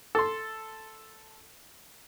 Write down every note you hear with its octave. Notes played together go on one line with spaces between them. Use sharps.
A4 C6